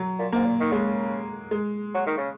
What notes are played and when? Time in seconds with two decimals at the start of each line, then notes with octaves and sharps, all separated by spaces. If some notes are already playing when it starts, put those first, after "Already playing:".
Already playing: F#3
0.19 A#2
0.32 G#2 A#3
0.46 A#2
0.60 D#3
0.72 C#3 G#3
1.51 G#3
1.95 F#3
2.07 D#3
2.18 C#3